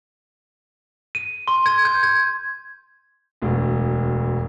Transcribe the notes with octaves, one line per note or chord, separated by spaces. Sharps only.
D#7
C6
G#6
G6
G#6
E1 D2